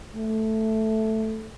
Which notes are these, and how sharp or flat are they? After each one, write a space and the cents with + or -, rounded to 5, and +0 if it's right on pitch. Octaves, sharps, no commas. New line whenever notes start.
A3 +0